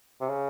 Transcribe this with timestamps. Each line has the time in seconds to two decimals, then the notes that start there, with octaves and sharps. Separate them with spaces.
0.21 C3
0.29 C#3